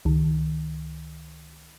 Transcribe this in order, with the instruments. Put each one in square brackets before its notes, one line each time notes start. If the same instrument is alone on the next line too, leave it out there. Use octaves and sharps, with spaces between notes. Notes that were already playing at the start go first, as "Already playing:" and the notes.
[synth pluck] C#2 D#3